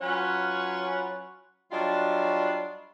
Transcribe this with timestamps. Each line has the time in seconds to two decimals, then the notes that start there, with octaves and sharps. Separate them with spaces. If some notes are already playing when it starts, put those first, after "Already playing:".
0.02 F#3 C#4 F4 B4 C#5 F#5
1.72 F#3 G3 D4 F4 D#5